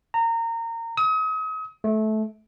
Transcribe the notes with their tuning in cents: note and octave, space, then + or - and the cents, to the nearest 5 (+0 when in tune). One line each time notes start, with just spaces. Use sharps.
A#5 -25
D#6 +40
A3 -20